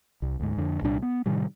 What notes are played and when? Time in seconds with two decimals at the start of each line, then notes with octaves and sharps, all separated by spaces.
0.22 C2
0.39 D2 G#2
0.57 F2 D3
0.82 C2 A#2 G3 D4
1.02 B3
1.26 A2 C3 D#3 G3